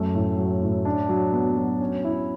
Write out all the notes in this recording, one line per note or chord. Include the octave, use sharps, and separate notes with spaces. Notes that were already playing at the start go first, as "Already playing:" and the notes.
Already playing: F#2 A3
A2
F#3
A2
D4
F#3
B3
F#3
C#4
E4